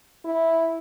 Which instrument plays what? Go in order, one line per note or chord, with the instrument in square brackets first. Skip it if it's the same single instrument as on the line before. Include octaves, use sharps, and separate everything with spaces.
[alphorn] E4